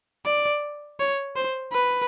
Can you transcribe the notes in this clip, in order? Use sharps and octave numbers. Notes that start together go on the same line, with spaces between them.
D5
C#5
C5
B4